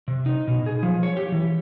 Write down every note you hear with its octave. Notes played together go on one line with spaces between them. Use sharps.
C3
D#4
B2
G#4
F3
C#5
G4
E3